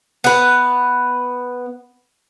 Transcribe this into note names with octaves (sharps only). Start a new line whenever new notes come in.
B3 B4